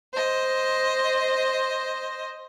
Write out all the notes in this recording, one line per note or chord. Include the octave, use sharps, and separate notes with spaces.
C5 D#5